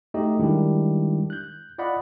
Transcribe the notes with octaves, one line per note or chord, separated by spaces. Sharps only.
A3 D#4 F#4 G4 D#5
D#3 G3 G#3 D4 E4 G4
F#6 G6
F4 D5 D#5 F#5 B5